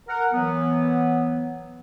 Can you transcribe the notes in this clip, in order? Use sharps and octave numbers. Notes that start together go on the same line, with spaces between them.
A#4 F#5
E3 F#3 B3